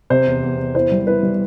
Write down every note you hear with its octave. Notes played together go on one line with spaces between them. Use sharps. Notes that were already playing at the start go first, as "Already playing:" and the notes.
C3 C5
E2
E2
E2
E4 C5
G3
E4 B4
G3